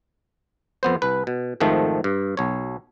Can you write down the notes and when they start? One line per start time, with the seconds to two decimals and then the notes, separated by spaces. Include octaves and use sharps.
0.83 F2 B3 C5
1.02 C2 B4
1.27 B2
1.60 F2 G#2 D#3 F3 A3
2.04 G2
2.37 B1 C#5